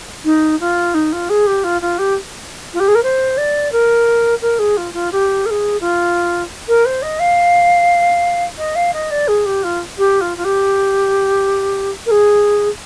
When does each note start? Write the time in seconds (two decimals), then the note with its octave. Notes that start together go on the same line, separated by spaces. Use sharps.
0.24 D#4
0.60 F4
0.94 D#4
1.12 F4
1.29 G#4
1.47 G4
1.64 F4
1.81 F4
1.98 G4
2.73 F4
2.80 G4
2.88 G#4
2.95 A#4
3.03 C5
3.38 D5
3.72 A#4
4.42 A#4
4.59 G#4
4.77 F4
4.93 F4
5.12 G4
5.46 A#4
5.50 G#4
5.80 F4
6.68 A#4
6.86 C5
7.02 D#5
7.20 F5
8.58 D#5
8.75 F5
8.93 D#5
9.11 D5
9.28 G#4
9.46 G4
9.63 F4
9.98 G4
10.21 F4
10.37 F4
10.44 G4
12.06 A#4
12.11 G#4